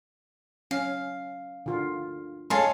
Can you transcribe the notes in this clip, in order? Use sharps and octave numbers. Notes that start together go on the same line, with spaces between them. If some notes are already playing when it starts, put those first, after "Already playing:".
C#4 F5
D3 F4
G#3 G#4 A4 C#5 F5 A5 C6